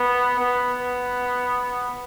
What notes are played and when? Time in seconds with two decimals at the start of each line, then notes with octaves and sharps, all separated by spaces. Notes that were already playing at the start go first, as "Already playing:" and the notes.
Already playing: B3
0.40 B3